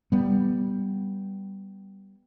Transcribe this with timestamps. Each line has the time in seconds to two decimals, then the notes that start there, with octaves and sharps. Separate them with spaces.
0.12 G3 B3